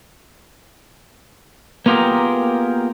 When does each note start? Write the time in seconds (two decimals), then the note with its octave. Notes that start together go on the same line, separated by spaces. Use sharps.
1.86 A#3 B3 F4 G4 G#4 A#4